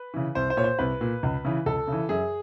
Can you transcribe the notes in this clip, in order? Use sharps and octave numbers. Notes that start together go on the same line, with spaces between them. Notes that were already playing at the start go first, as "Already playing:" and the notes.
Already playing: B4
C#3 E3
C2 C5
C5
A#2 C#5
C5
C2 B4
A#2
C#2
C#3 E3
C#2 A4
C#3 E3
F#2 G#4